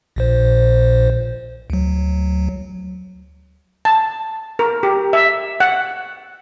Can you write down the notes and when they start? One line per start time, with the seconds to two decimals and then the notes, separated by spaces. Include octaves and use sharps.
0.16 A#1 A#2 C5
1.70 D2 F#3
3.85 A5
4.59 A#4
4.83 G4
5.13 E5
5.60 F#5